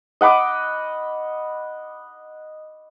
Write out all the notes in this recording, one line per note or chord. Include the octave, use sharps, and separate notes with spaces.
D#5 F#5 B5 D6